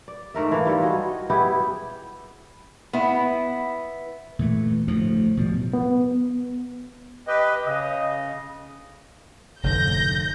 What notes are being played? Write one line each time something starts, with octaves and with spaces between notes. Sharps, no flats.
D5
G#2 A3 A#4 E5
E3 A#3
G3 F4 A4
F#4 G#4 D#5
B3 E4 G4 G#4
B3 E4
A#2 E3 A3
D2 A2 F3
B2 F3 G3
B3
G4 B4 D#5
C#3 D#5
F1 G#2 D3 G6 A#6